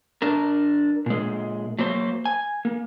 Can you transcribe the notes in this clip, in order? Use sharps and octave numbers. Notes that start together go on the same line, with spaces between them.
D4 A#4
A#2 G#3
F#3 A#3 C5
G#5
A#3